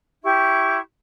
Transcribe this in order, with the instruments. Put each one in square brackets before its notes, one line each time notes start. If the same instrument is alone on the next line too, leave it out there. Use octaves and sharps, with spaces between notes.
[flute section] E4 G4 C#6